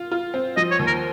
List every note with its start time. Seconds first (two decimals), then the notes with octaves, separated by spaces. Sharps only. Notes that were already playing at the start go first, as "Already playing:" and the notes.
Already playing: F4
0.12 F4
0.34 C4
0.57 F3 D#5
0.71 C#5
0.79 D#2
0.87 A#4